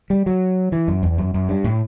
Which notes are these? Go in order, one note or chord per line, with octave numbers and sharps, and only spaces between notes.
G3
F#3
E3
F#2
E2
F#2
F#2
G2
A2